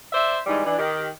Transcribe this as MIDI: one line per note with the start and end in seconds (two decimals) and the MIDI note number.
0.13 0.37 72
0.13 0.37 74
0.13 0.37 76
0.46 0.64 44
0.46 0.64 52
0.46 0.64 55
0.46 0.64 63
0.66 0.77 52
0.66 0.77 62
0.79 1.07 51
0.79 1.07 67